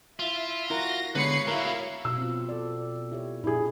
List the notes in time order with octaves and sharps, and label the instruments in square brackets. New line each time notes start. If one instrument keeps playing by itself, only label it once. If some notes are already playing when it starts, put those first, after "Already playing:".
[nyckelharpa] E4 [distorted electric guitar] F4 [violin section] E5
[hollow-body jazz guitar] E4 A#4 [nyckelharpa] F#4 [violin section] A#6
[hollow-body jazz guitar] D3 G#3 B3 [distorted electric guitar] B4 B5 [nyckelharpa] C#5 [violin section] C7 C#7
[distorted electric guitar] A2 F#4 [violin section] E4 F5 [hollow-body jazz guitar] A#4
[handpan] B2 [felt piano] E6
[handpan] C4 F4
A4 D5
E4 G4 C#5
[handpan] A#2 D4 [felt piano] E4 G#4